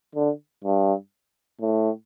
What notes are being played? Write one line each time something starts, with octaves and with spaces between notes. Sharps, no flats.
D3
G2
A2